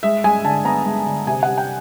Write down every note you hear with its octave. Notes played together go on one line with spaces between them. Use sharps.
G#3 E5
G#3 G#5
D3 A5
B3 A#5
G#3
D3
C3 G#5
G3 F#5
G5